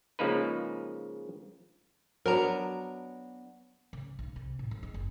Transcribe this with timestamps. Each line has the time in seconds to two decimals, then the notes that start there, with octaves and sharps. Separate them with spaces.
0.19 C#3 F3 G#3 A#3 D#4 B4
2.26 F#3 B3 D4 A#4 A#5
3.93 C#3
4.19 B1
4.36 C3
4.59 A2
4.71 F2
4.83 G#3
4.94 F#1